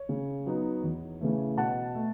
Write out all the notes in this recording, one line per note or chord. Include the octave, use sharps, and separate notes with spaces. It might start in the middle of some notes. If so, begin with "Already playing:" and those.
Already playing: C#5
C#3
F#3 B3 D#4
E2
C#3 E3 A3
B2 F#5 A5
A3